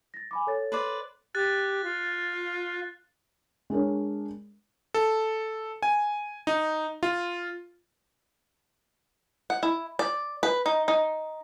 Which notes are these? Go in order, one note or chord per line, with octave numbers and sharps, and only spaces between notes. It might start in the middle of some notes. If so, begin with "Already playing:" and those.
A6 A#6
G#5 B5 D6
A4 C#5 A6
B4 C5 D5
G4 F#6 A6
F4
G#3 D4 A#4 C#5
A4
G#5
D#4
F4
F#5
E4
D5
B4
D#4
D#4